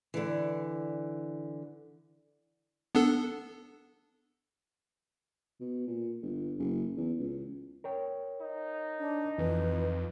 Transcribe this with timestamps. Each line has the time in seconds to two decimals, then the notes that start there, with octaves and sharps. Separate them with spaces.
0.14 D3 E3
2.95 B3 D4 A4
5.60 B2
5.88 A#2
6.22 G1
6.59 F#1
6.97 E2
7.19 C#2
7.84 A#4 C#5 G5
8.41 D#4
8.99 D4
9.38 F2 E3 B4